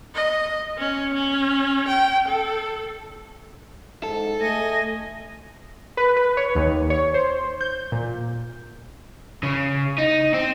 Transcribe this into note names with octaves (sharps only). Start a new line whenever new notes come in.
D#5
C#4
C#4
G5
A4
G#2 A4
A3 D#5 G#5 A#6
B4
B4
C#5
D#2
C#5
C5
G6
A#2
C#3
D#4
C4